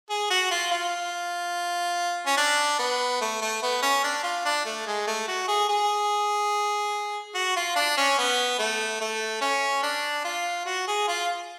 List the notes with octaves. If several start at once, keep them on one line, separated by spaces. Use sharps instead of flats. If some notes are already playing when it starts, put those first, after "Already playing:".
G#4
F#4
F4
F4
C#4
D4
B3
A3
A3
B3
C#4
D4
F4
D4
A3
G#3
A3
F#4
G#4
G#4
F#4
F4
D4
C#4
B3
A3
A3
C#4
D4
F4
F#4
G#4
F4